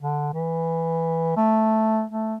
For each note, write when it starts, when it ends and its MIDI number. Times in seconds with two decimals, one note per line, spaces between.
0.02 0.30 50
0.34 1.33 52
1.37 2.05 57
2.10 2.37 57